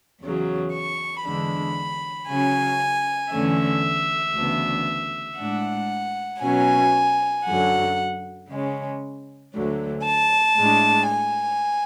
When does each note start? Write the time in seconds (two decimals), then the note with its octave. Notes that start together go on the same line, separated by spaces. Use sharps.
0.21 E2 C#3 F#3
0.73 C#6
1.25 E2 D3 G#3 D4 B5
2.28 C#3 F#3 C#4 G#5
3.31 E2 D3 A3 C#4 E5
4.35 D2 C#3 E3 B3 D4
5.39 A2 G#3 D4 F#5
6.43 B2 F#3 C#4 G#5
7.46 F#2 D3 F#3 F#5
8.50 C#3 G#3 C#4
9.53 D2 D3 F#3
10.05 A5
10.57 A2 G#3 D4
11.09 G#5